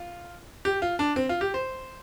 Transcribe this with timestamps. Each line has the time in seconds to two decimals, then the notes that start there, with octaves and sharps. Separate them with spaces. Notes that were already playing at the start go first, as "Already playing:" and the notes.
Already playing: F4
0.65 G4
0.82 F4
0.99 D4
1.16 C4
1.29 F4
1.41 G4
1.54 C5